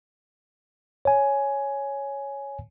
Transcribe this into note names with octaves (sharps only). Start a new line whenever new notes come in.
C#5 G#5